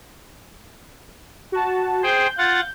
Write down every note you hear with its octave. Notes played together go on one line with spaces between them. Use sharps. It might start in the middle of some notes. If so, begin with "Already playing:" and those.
F#4 A5
G#4 C5 G5 G6
F4 F#5 A6